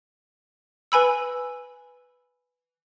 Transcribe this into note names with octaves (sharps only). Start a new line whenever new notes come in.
B4 G#5 B5 E6